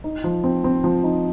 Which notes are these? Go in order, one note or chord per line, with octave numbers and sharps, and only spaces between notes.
D#4
F3
C4
C4
F3
D#4